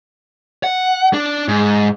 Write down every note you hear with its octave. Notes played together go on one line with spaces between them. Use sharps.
F#5
D4
G#2